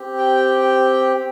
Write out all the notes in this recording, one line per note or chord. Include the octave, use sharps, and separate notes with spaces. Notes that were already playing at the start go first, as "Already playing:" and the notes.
Already playing: C4 G4
G5
G5